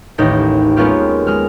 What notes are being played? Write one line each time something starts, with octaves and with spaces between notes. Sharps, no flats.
A1 D#2 D#4 G4 A#6
G#3 A#3 B3 C#4 F4 G4
G#3 F6